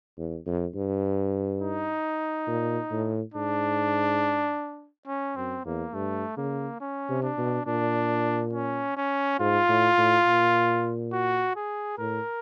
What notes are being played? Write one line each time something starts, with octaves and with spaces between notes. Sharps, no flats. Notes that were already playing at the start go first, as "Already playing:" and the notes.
E2
F2
G2
D#4
A#2
A2
G#2 D4
C#4
F#2 C4
E2 A#3
G2 A3
C#3 A#3
C#4
C3
D4
B2
A#2 D4
C#4
C#4
G#2 F4
A2
A2
A#2
F#4
G#4
A2 A#4